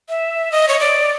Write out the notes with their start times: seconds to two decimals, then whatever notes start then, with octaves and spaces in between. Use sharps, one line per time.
0.09 E5
0.52 D#5
0.68 C#5
0.80 D5